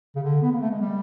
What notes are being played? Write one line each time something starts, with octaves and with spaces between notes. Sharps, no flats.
C#3
D3
B3
A#3
A3
G#3
G3